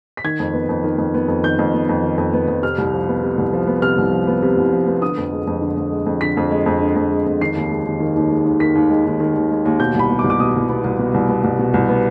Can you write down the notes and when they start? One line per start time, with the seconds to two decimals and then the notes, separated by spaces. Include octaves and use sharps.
0.17 B6
0.24 D#3 G#6
0.40 F2
0.53 B3
0.69 F2
0.84 D#3
0.98 F2
1.14 B3
1.28 F2
1.43 D#3 G6
1.59 F2
1.73 B3
1.89 F2
2.03 D#3
2.18 F2
2.33 B3
2.48 F2
2.62 C3 F6
2.78 C2
2.93 F3
3.08 B3
3.23 C3
3.38 C2
3.53 F3
3.67 B3
3.82 C3 F6
3.98 C2
4.12 F3
4.27 B3
4.42 C3
4.57 C2
4.72 F3
4.87 B3
5.02 D3 D#6
5.18 F2
5.32 G#3
5.47 F2
5.62 D3
5.77 F2
5.92 G#3
6.06 F2
6.21 D3 B6
6.37 F2
6.51 G#3
6.66 F2
6.82 D3
6.96 F2
7.11 G#3
7.26 F2
7.41 D#3 C7
7.56 D#2
7.70 G#3
7.86 D#2
8.00 D#3
8.16 D#2
8.30 G#3
8.45 D#2
8.60 D#3 B6
8.75 D#2
8.90 G#3
9.05 D#2
9.20 D#3
9.35 D#2
9.50 G#3
9.65 D#2
9.80 B2 G6
9.94 C2 B5
10.10 B3
10.19 D6
10.24 C2
10.30 D6
10.40 B2 D#6
10.55 C2
10.69 B3
10.84 C2
10.99 B2
11.14 C2
11.29 B3
11.44 C2
11.59 B2
11.74 C2
11.89 B3